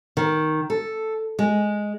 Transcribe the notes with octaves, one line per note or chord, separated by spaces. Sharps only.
D#3
A4
G#3